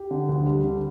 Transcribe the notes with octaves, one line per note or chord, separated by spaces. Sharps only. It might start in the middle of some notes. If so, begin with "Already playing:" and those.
Already playing: G4
D3
D2
G3
D3